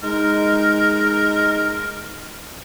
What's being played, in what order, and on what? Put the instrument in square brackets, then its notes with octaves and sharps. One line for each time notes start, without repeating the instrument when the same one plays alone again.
[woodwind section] G#3 D#4 [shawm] A#4